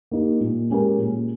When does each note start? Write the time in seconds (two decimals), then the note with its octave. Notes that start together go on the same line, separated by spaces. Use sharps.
0.11 A#3 D#4 G4
0.40 A#2
0.70 G#3 C#4 G4 A#4
0.98 A#2